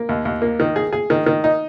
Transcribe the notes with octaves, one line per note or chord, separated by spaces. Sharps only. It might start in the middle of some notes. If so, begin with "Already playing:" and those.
Already playing: A#3
D#2
D#2
A#3
D#3
G#4
G#4
D#3
D#3
D#4